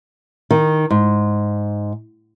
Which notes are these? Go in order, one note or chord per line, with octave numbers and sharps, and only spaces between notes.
D#3
G#2